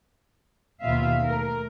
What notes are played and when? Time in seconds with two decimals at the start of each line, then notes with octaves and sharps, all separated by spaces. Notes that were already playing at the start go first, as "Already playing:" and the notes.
0.81 D#2 B2 F4 E5 F5
1.20 A3 A#4